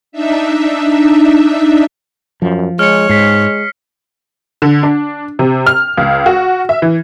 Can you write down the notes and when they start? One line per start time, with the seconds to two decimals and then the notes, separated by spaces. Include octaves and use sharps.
0.12 D4 D#4 E5
2.42 F#2 F3
2.79 G#3 C#5 F6 C#7
3.09 G#2 G#3 B6 C7
4.62 D3
4.83 D4
5.39 C3
5.66 F6
5.98 C#2
6.26 F#4
6.69 E5
6.82 E3